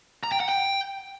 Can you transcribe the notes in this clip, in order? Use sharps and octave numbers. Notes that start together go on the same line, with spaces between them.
A#5
G5
F#5
G5